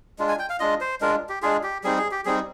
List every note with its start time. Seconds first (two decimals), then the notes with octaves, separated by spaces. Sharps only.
0.19 G#3 D4 F4
0.29 G#5
0.39 G5
0.50 F5
0.60 G#3 D4 F4 D#5
0.81 C5
1.01 G#3 D4 F4 A#4
1.29 G4
1.43 G#3 D4 F4 G#4
1.63 G4
1.84 G3 C4 D#4 G#4
1.98 G#4
2.11 G4
2.25 G3 C4 D#4 G#4